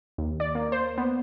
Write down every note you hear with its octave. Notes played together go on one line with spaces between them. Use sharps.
D#2
D5
A#3
C5
B3